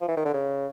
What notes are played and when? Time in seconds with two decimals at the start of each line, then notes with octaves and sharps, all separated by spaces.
0.01 F3
0.08 E3
0.17 D#3
0.25 D3
0.34 C#3